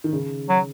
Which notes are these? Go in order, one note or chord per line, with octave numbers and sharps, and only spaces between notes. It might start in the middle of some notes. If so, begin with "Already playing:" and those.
D#3
C#3
F#3